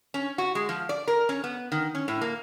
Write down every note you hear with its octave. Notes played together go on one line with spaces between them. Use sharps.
C#4
F#4
G#3
F3
D5
A#4
C#4
B3
D#3
C#4
A2
A#3